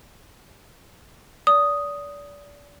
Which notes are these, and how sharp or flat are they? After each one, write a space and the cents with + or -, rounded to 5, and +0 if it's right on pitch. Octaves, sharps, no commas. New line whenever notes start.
D5 -30 D#6 +0